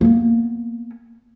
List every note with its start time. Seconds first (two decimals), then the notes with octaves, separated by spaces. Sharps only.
0.01 A#3 B3